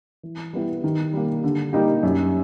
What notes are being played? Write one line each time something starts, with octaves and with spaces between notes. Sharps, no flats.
E3
G3 B3 E4
D#3
G3 A#3
D3
G3 A#3 D#4 G4
F#2